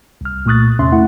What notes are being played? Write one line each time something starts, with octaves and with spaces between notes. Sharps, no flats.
C2 F6
A#2 A3 C#6 D#6 F#6 A6
E2 C3 C#4 E5 C6
A3 E4 F#5